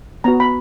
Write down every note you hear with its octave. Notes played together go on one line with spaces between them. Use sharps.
B3 F#4 A#5
B5